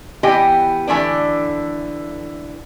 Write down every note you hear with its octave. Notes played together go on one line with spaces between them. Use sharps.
E3 B3 G4 D#5 G5
D3 E3 A3 A#3 D4